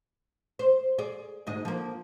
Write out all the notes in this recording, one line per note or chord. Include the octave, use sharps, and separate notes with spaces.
C5
G#4 D5
D2 G#2 D#5
F3 A#3